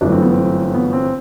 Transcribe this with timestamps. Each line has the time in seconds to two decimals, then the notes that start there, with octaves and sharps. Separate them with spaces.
0.01 G1 F#2 E3 A3 D4
0.12 C4
0.22 B3
0.32 C4
0.74 B3
0.93 C4